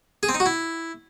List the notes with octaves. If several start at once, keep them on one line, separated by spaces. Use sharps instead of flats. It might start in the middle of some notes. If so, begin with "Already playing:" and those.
G#4
C4
D#4
F#4
E4